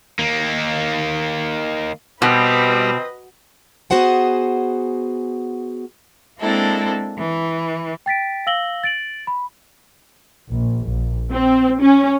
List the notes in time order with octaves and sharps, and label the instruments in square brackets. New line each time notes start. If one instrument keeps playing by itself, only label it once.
[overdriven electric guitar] D#3 A#3
[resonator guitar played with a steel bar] B2 [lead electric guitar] G3 [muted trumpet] C4 [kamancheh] B4 D#5
[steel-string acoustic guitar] B3 F#4 G#4 C5 F#5 G#5
[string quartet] G#3 A#3 C4 D4 E4 A4
E3
[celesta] G5 A6 B6 D7
F5 E6 A#6 F#7 G7
A6 D7 F#7
B5
[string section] A#1
A#1
C4
C#4